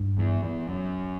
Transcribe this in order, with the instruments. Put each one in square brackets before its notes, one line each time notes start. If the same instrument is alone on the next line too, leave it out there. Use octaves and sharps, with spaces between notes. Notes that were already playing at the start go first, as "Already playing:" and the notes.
Already playing: [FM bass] G2
[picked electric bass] E2
E2
F#2